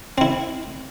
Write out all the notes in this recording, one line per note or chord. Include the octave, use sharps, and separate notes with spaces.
C4 E4